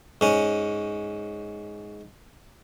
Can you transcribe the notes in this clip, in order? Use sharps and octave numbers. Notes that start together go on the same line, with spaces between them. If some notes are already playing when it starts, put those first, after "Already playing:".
G#2 C#4